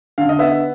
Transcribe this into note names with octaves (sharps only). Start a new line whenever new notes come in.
D3 F5
D#5
B3 E5